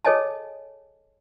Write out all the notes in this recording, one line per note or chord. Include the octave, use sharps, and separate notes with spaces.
G#4 A4 C#5 D#5 G#5 A5